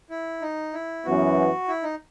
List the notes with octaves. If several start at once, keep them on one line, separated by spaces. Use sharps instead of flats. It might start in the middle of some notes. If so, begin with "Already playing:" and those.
E4
D#4
E4
F#2 E3 B3 F#4
E4
D#4